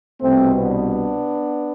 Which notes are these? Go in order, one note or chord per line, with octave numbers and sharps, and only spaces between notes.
C2 B2 A3 C4
B3 D4